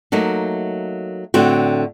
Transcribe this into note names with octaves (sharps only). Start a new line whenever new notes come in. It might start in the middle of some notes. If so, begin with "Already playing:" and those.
F#3 A3 A#3 D#4
A2 D3 C4 F#4